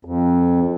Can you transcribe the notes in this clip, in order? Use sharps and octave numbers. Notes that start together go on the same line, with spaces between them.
F2